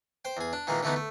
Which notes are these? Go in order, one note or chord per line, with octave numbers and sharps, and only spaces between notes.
C5 G5
E2 G#4
D4
A#2 D#3 E3 G#3 A#3
D3 E3 A3 B3 D#4
A3